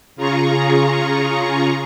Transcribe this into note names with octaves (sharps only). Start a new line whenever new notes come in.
C#3 F4 G#4 A#5 C#6